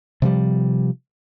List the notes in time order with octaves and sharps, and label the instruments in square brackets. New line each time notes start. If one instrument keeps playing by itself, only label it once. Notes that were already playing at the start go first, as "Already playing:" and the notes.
[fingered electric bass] C3 F3 G3